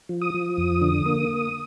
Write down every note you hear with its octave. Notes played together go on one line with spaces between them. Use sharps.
F3
D#6
F3
F2
D3
A#3